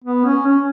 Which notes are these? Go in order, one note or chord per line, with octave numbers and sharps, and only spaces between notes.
B3
C#4
C#4